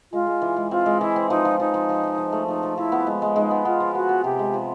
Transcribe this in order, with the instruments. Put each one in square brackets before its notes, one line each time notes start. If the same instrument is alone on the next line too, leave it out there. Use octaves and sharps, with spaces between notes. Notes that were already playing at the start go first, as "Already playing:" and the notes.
[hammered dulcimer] G#3 [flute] F4
[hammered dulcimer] G#3
E3
G#3
[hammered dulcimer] C4 [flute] F4
[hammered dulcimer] G#3
[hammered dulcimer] E3 [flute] E4
[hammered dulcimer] C4
[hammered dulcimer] F3 [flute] D#4
[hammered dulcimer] F3
[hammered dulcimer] F3 [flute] D#4
[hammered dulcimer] F3
F3
F3
F3
A3
[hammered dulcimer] F3 [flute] D#4
[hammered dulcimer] F3
[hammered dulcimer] F3 [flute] E4
[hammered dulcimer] B3
G#3
G#3
[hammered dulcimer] G#3 [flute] D#4
[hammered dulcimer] B3
[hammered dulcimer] B3 [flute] F4
[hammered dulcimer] F3
[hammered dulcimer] B3 [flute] F#4
[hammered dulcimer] B3
[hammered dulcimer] C3 [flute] G4
[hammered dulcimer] G#3
F3